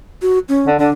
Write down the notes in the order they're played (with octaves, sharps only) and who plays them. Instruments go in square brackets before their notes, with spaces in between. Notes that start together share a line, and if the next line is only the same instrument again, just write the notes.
[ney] F#4
C#4
[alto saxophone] D3
[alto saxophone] D3 [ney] D4